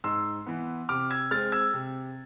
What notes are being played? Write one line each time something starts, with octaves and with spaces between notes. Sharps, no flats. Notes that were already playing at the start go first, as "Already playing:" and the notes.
G#2 C6 E6
E3 B3
C3 D6 F6
E6 G#6
G#3 C4 F6 A6
E6 G#6
C3